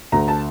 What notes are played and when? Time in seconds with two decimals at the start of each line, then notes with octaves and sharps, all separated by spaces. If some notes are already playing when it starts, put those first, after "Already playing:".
0.12 D2 A#5
0.28 A5